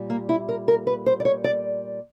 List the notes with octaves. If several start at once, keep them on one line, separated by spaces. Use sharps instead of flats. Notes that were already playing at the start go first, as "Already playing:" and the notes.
Already playing: A#2 G3
A#3
E4
A#4
A#4
B4
C5
D5
C#5
D5